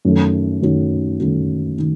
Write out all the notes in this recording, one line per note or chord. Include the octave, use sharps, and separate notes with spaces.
F#2 D#3 F#3 A3
F#2 D#3 F#3 A3
F#2 D#3 F#3 A3
D#3